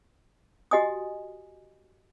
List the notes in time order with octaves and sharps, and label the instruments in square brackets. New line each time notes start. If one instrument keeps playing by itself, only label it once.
[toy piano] F#4 G4 D#5 G#5 D#6